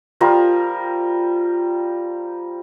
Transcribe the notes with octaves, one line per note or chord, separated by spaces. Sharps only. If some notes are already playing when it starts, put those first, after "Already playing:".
F3 G3 F4 A#4